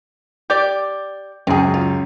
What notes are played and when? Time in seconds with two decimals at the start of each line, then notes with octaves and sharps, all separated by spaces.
0.50 G4 D5 G6
1.47 C#2 F#2 C4 G#4
1.74 F4